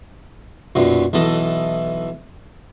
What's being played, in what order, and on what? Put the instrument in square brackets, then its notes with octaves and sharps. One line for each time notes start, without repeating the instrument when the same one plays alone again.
[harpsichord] B1 F#2 A#2
B1 E3 A4 D#5